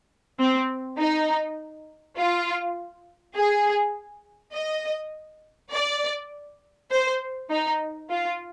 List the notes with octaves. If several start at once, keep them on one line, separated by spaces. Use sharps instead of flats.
C4
D#4
F4
G#4
D#5
D5
C5
D#4
F4